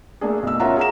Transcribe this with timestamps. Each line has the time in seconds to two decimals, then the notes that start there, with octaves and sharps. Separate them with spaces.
0.21 A3 A#3 D4 G#4
0.43 B1 E6
0.60 C#4 F4 A#4 E5 F#5 A#5
0.77 G#4 A#5 E7